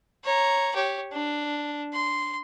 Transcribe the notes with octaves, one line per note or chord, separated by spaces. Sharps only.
C#5 A#5
G4 C#5
D4
C6